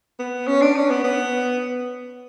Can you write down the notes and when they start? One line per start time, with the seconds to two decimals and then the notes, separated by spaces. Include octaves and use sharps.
0.19 B3
0.47 C#4
0.62 D4
0.76 C#4
0.90 B3
1.04 B3